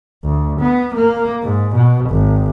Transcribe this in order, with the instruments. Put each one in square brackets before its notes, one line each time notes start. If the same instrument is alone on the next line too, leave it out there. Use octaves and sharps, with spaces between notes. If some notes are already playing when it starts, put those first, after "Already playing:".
[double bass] D2
B3
A#3
G#2
B2
G#1